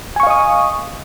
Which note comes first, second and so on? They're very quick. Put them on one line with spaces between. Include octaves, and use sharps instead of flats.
G#5 C#6 F5 D#5 D#6